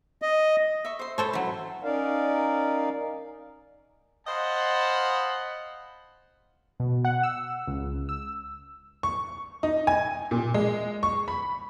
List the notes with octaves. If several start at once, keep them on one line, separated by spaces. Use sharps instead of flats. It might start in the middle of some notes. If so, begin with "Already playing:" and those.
D#5
E5 C#6
C5 C6
A4 C5 C#5 A5 B5
F#3 E4
C#4 D#4 A#4 D5 F5
C5 D#5 F5 F#5 A5 B5
B2
F#5
E6
C#2
E6
C#6
D#4
G#5
A#2
G#3
C#6
B5